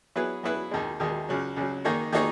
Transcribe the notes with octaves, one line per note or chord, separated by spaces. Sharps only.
F#3 B3 E4 G#4 B4
F#3 B3 E4 G#4 B4
D#2 D#3 G#3
D#2 D#3 G#3
C#2 C#3 F#3
C#2 C#3 F#3
D#3 A#3 D#4 G#4 C#5
D#3 A#3 D#4 G#4 C#5